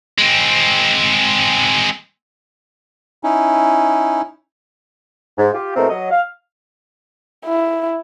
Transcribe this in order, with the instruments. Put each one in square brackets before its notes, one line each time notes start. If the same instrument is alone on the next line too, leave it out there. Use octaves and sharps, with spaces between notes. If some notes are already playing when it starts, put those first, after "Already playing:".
[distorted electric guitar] G#3 C4
[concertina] C#4 D#4 E4
[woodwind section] G#2
F4 G4
B2 G#3 A3 C4 E4 A#4
F#3 D#5
F5
[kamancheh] E4